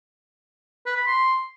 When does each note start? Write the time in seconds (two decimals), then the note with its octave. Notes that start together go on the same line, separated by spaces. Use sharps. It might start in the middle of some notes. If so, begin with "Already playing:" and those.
0.86 B4
0.96 B5
1.07 C6